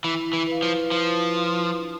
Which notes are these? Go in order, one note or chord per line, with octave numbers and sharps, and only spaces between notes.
E3 E4
E3
B4 F5
F3
F3 E4
B4 F5
D4